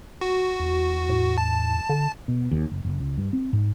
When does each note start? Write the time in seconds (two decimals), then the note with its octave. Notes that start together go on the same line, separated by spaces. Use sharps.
0.21 F#4
0.60 E2
1.09 A2
1.38 A5
1.89 D3
2.28 B2
2.51 D#2
2.72 F#1
2.85 F#1
3.00 C#2
3.18 G2
3.33 C4
3.53 G#2